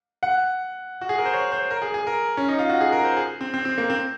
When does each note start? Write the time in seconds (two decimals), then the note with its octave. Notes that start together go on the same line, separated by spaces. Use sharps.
0.23 F#5
1.01 F#4
1.09 G#4
1.18 A#4
1.25 C5
1.34 C#5
1.52 C5
1.71 A#4
1.82 G#4
1.94 G#4
2.07 A#4
2.37 C#4
2.48 D#4
2.59 F4
2.69 F#4
2.81 G#4
2.92 A#4
3.04 C5
3.17 G#4
3.41 C4
3.54 C4
3.65 C4
3.78 A#3
3.90 C4